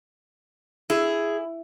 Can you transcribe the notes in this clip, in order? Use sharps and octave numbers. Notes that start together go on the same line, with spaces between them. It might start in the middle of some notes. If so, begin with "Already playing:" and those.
E4 G#4